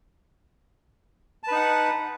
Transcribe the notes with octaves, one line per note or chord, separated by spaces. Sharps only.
D#4 B4 F#5 A5